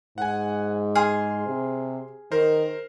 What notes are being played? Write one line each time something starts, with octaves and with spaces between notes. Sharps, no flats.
G#2 F#5 G#5
G#4 C6 F6
C3
D#3 A#4 C5